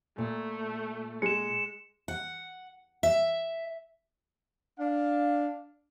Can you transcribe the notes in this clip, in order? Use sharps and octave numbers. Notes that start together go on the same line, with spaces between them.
A#2 A3
G#3 C#7 E7
F#5
E5
D4 F5